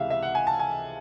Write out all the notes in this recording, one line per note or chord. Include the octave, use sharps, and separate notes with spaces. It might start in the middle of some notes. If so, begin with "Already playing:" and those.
Already playing: C#2 C3 E3 E5 F5
E5
F#5
G#5
A5
G#5